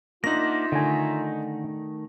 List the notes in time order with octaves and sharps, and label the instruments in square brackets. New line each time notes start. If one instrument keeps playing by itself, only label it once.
[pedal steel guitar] A#3 D4 F#5 [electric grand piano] D#4 A#6 [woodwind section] F4 E5
[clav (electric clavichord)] D3 G#5 [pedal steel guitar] D#3 A3